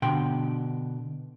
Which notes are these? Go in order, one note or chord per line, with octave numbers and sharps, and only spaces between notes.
B2 D3 G5 C6